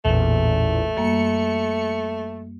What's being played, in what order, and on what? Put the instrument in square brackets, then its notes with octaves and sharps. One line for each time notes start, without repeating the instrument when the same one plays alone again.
[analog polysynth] A1 E2 A#2 [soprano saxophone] A3
[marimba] F#2 G3 A#3 [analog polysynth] C#7